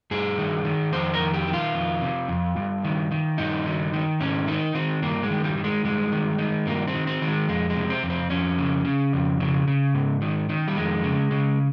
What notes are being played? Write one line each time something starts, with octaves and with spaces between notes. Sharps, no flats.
G2 G#4
D#3
D#3
F2 C5
A#4
D#3
G4
D#3
F4
F2
C3
F2
G2
D#3
D#3
G2 D#4
D#3
D#3
G#2 C#4
D#3 D#4
D#3 C4
G2 A#3
G#3
D#3
G3
D#3
G#3
G2 G#3
D#3
D#3
G2 A#3
C4
D#3
C4
D#3
G#3
F2 G#3
G#3
C3
C4
F2
C4
F2 C#4
C#3
C#3
F2
C#3
C#3
G#2
D#3
D#3
G3
F2 G#3
C#3
C#3